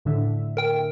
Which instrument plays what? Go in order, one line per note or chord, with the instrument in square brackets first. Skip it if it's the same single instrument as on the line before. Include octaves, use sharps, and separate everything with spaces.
[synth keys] A2 D3 E5
[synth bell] A#4 G5